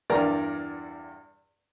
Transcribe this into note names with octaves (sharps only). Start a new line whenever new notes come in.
E2 G2 A#4 D5 A#5 F6